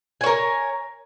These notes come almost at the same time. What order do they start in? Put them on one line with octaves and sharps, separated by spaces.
G#5 C#5 A#4